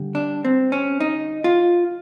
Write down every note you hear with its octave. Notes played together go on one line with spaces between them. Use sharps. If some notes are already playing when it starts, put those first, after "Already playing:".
Already playing: D3 G3
D4
C4
C#4
D#4
F4